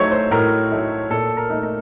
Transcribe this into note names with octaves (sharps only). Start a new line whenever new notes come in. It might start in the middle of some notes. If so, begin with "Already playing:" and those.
Already playing: A2 F#3 A3 D#4 C5 C#5
C5
A2 A#4
F#3 A3 D#4
A#2 A4
A#4
A3 D#4
A#4